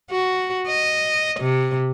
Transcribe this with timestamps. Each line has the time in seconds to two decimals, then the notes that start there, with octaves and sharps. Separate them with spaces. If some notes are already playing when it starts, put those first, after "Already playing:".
0.11 F#4
0.68 D#5
1.40 C3